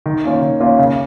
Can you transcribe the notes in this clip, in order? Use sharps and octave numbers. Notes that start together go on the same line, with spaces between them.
D#3
A#3 C#4 F4
D#3
A#3 C#4 F4
C#3